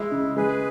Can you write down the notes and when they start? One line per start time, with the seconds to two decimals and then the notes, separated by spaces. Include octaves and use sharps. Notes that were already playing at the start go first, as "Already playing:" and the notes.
Already playing: G#3 E4
0.11 C#3
0.36 G#3 G#4 B4